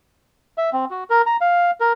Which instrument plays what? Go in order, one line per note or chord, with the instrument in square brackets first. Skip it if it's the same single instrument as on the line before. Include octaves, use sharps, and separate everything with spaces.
[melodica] E5
C4
F#4
A#4
A#5
F5
A#4